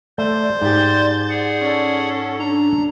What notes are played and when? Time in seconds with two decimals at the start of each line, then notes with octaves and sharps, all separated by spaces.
0.18 A3 C5 D5 C6
0.62 G#2 G4 G6 A6
1.30 G#4 F#5
1.61 C#4 A4
2.40 D4 A#5